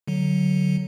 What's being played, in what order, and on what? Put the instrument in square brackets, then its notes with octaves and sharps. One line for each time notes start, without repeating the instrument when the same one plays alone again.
[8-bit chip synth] D3 F#3